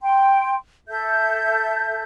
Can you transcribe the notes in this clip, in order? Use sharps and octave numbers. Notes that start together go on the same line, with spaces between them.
G5 C6
A4 E5 G6